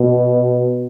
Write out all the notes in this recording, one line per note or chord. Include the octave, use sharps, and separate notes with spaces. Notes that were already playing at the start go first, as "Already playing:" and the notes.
Already playing: B2